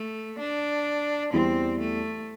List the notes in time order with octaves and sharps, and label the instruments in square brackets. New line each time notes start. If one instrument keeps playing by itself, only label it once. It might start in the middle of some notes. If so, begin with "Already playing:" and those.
Already playing: [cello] A3
D4
[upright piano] E2 E3 G3 E4 [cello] C4
[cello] A3